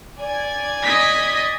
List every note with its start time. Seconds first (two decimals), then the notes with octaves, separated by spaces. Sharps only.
0.19 D5 G#5 G#6
0.83 D#5 B6